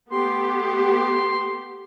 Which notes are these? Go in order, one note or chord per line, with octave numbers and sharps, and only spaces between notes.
A3 B3 G4 C6